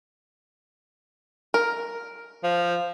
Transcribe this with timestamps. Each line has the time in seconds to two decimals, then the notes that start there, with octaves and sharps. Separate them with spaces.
1.54 A#4
2.44 F3